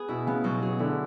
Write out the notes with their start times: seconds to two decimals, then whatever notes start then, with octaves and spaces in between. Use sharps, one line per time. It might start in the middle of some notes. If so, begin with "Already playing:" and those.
Already playing: B3 G#4
0.08 B2 E4
0.27 C#3 B3
0.44 B2 F#3
0.63 B2 G#4
0.79 D3 E4